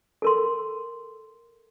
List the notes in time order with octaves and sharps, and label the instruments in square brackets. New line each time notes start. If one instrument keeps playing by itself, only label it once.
[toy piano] A4 A#4 C6